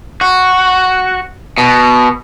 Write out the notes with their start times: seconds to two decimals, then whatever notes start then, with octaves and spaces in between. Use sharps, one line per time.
0.21 F#4
1.58 B2